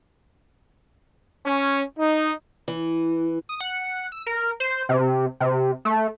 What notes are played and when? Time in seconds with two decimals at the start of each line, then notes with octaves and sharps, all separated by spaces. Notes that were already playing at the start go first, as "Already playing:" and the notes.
1.44 C#4
1.97 D#4
2.68 E3
3.49 D#6
3.61 F#5
4.12 E6
4.27 A#4
4.60 C5
4.89 C3
5.40 C3
5.85 A3